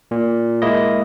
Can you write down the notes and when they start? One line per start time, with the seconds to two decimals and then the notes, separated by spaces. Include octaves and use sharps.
0.11 A#2
0.62 G#3 A#3 E4 D#5